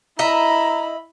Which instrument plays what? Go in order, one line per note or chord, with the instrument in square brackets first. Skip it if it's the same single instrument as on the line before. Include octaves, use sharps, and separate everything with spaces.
[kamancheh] E4 B5 [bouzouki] D#5 E5 [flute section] A#5